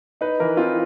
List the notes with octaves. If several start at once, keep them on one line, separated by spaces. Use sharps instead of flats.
D#4 B4
E3 A#4
C4 F4